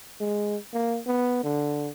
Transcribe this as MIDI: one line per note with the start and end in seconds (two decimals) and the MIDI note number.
0.20 0.57 56
0.74 0.99 58
1.06 1.43 59
1.44 1.90 50